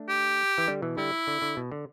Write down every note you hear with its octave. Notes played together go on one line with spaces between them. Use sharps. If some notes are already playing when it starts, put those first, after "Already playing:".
Already playing: A3 D4
G4
E3
D3 G3
B2 E3
D3 G3 E4
D3
D3
B2
D3